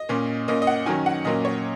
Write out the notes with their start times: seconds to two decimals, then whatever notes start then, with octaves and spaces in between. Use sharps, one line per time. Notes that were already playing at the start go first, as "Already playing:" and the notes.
Already playing: D#5
0.09 A#2 A#3 C#4
0.48 A#2 A#3 C#4 D#5
0.62 D#5
0.67 F#5
0.86 D#3 F#3 C#4 G#5
1.06 F#5
1.25 A#2 F#3 A#3 C#4 D#5
1.45 C#5